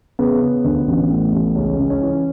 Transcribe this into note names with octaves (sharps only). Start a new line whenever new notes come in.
C#3 B3
C#3
D2
A1
A2
A1
C#2 C#4
C#2
C#4
E3